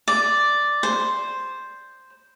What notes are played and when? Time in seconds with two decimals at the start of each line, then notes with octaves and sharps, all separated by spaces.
0.08 D5
0.83 C5